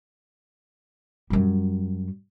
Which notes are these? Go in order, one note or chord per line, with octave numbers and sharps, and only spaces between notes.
F#2 G3